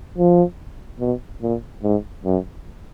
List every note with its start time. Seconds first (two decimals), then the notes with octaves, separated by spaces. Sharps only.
0.18 F3
1.00 B2
1.42 A#2
1.83 G#2
2.25 F#2